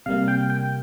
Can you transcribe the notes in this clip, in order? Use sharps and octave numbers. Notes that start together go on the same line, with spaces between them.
C3 G3 A#3 F5
G5
G5